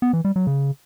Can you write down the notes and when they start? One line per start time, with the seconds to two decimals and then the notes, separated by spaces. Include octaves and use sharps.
0.02 B3
0.13 E3
0.25 G3
0.36 F#3
0.47 C#3